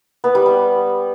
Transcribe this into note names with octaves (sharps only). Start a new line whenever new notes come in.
B3
G3
G3